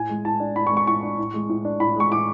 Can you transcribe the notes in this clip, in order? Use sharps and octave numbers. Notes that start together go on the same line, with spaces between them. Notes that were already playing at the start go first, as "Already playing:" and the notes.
Already playing: A2 G#5
G#3
A2 A5
D4
A2 B5
C#6
G#3
C#6
A2 C#6
D4
A2
G#3
A2
D4
A2 B5
G#3 C#6
A2 D6